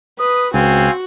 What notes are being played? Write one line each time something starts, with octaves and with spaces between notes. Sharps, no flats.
B4 D#6
C#2 C4 F#4 F5 G#5